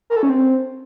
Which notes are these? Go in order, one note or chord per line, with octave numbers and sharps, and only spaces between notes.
A#4
A4
C#4
C4